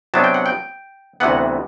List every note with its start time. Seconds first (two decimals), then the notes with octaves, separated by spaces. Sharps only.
0.14 C3 F#3 B3 D4 A5
0.24 G5
0.34 F#5
0.46 G5
1.20 D2 C3 E3 B3 F#5